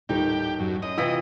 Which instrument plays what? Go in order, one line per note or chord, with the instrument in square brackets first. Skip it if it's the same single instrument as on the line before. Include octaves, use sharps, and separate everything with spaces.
[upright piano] D#1 A2 D#3 [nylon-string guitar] D#4 [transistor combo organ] G4
[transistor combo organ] F#2
[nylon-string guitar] F#2 [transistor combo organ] D#5
[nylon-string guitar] C3 E3 F4 [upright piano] E6 B6